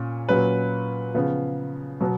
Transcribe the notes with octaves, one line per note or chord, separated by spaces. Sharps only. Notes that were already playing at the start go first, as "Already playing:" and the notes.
Already playing: A#2 C#4
A#2 F#3 C#4 B4
C#3 F3 B3
B2 F#3 B3